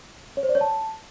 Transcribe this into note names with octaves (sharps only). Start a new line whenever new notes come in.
C#5
C5
D5
C#5
A5